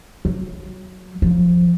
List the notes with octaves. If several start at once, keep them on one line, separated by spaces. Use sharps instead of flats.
F#3
F3